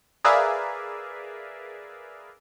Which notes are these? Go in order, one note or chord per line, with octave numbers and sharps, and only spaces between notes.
G#4 A#4 B4 D5 E5 F5